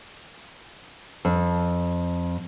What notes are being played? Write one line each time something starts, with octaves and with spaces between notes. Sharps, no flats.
F2